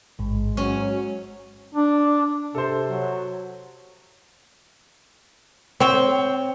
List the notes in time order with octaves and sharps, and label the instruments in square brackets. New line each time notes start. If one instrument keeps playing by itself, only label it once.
[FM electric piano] A1 G#2 [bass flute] G#3
[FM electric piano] G#2 [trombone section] F#3 [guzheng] C#4
[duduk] D4
[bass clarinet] C3 [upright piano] A4 C5
[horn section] F#3
[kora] C4 [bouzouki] C#5 G5